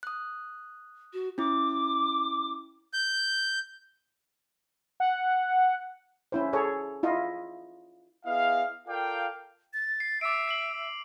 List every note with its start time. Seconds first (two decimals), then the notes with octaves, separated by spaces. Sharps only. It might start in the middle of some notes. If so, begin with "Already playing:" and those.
0.03 D#6 F#6
1.13 F#4
1.38 C#4 E4 D6
2.94 G6
5.00 F#5
6.32 C#4 E4 C5
6.53 G#4 A4 C#5
7.03 E4 F4 D#5
8.26 B3 E4 G#4 D#5 F5
8.88 F4 A4 A#4 D5 F5 G5
9.73 A6
10.00 C7
10.21 E5 D6 D7
10.48 C7 D7 F#7